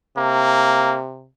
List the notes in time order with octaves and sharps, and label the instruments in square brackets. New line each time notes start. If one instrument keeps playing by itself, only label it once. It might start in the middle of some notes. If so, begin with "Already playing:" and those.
[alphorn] C3 [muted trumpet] A#3